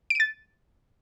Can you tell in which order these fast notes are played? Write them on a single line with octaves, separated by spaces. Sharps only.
D7 D#7 A6